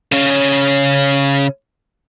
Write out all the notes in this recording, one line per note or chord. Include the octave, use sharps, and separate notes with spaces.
C#3 C#4